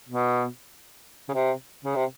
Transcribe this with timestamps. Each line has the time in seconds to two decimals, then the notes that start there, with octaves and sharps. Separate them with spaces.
0.09 B2
1.29 C#3
1.33 C3
1.85 C#3
1.96 C3